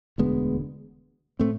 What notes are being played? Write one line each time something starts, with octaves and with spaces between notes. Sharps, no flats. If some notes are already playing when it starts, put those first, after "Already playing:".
E1 D2 D3 G#3 B3
A2 A3 C4